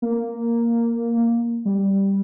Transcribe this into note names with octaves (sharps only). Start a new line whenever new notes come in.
A#3
G3